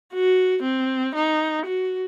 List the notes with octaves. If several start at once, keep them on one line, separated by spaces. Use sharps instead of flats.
F#4
C4
D#4
F#4